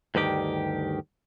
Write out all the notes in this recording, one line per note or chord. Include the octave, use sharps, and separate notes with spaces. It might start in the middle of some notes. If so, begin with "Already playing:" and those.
D2 G2 D#3 G4